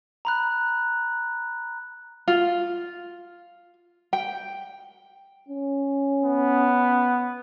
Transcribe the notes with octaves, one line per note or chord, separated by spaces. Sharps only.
A#5 B5 F#6
F4
G5
C#4
B3